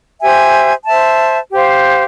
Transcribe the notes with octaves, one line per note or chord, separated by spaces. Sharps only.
G4 C5 E5 G#5
C5 E5 A5
G4 C5 F5